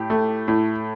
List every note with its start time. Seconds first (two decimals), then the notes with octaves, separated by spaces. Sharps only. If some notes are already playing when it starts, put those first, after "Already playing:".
Already playing: A2 G4
0.10 A3
0.48 A2